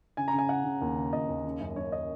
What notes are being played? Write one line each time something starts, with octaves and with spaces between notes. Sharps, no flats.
C#3 G#5
A#5
C#3
G#5
C#3 F#5
C#3
D#2
C#3
D#2 D#5
D#2
C#3
F#2
F#2 C#5
D#5